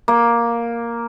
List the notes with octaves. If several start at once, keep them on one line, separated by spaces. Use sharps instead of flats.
A#3